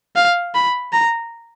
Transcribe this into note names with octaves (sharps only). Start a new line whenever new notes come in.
F5
B5
A#5